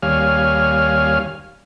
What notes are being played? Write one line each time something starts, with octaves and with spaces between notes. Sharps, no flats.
D#2 G3 C#5 F5 G#5 F6